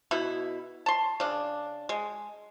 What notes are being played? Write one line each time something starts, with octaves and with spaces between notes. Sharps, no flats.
B2 E4
A5 C6
C#3 D4
G#3